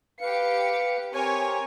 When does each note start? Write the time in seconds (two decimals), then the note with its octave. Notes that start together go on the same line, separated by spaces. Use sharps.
0.21 G4 B4 F5 C#7
1.13 C4 G4 A#4 C#5 G#5